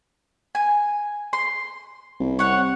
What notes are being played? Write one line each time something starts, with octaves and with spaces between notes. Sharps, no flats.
G#5
C6
C2
C#5 F#5